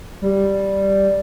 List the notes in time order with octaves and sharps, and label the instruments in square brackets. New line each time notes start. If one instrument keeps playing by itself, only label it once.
[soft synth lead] G3